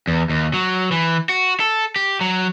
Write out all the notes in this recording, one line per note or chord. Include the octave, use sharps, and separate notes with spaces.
E2
D#2
F#3
E3
F#4
A4
G4
F#3